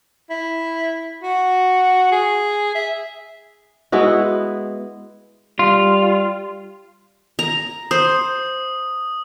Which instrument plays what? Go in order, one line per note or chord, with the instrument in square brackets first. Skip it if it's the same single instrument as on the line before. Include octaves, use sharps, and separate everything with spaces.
[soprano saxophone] E4
F#4
G#4
E5
[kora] G#3 B3 E4 F#4
[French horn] G3 [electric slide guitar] F4
[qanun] A#5
[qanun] C5 [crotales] D#6